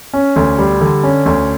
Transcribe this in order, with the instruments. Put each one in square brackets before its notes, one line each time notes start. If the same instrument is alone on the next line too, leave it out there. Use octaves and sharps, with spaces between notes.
[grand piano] C#4
D2
G3
D3
C#4
D2